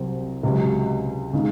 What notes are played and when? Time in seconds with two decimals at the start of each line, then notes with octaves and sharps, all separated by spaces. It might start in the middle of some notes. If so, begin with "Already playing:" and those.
Already playing: C2 C3 F#3 C4
0.43 C#2 C3 F#3
1.33 C#3 G#3 D#4